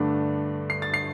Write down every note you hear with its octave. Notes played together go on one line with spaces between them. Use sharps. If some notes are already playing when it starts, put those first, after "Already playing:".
Already playing: G2 D3 A3 D4
C7
A6
C7